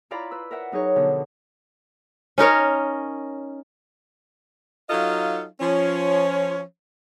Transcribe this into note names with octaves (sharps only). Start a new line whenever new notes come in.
E4 F4 D5 F5 A#5 B5
B4 E6
A#4 E5 F#5
F#3 D#4 G#4 C#5
B2 D3 F3
C#4 D#4 A#4 C#5
F#3 D#4 F4 A4 D#5 F5
F3 C#4 C#5